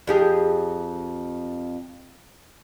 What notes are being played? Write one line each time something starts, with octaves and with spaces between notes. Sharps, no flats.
F2 G4 G#4